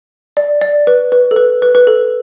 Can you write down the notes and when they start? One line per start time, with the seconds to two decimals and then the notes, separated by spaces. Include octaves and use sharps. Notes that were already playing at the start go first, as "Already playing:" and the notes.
0.37 D5
0.61 D5
0.87 B4
1.12 B4
1.31 A4
1.36 B4
1.62 B4
1.75 B4
1.87 A4